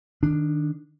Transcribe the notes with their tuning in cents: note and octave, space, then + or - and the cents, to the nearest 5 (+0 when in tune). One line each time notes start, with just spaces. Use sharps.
D#3 -15 D4 +5